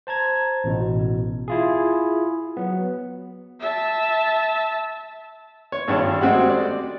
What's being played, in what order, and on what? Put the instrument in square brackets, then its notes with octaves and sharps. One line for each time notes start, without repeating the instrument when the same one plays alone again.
[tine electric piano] C5 A5 A#5 G#6
A1 B2
E4 F4 G#4
F#3 B3
[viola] E5 A5
[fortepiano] C#5
G#1 G2 A5
G#3 A3 C4 F#4 G4 F#5
D5